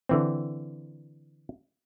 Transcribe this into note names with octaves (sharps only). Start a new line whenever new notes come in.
D3 E3 C4